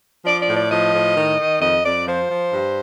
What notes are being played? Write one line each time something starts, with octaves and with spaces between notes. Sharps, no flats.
F3 D5
D5
A2
D5
F3 D#5
A2
D#3
D#3
F2 D#5
F2 D5
F3 C5
F3
G2